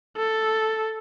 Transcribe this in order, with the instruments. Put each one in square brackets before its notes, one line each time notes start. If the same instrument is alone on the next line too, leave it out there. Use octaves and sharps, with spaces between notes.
[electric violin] A4